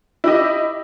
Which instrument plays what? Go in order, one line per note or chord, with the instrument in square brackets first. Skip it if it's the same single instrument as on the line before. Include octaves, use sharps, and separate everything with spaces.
[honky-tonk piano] E4 G4 D#5